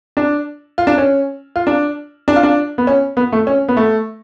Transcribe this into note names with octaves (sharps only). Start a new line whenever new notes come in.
D4
F4
D4
C#4
F4
D4
D4
F4
D4
B3
C#4
B3
A3
C#4
B3
A3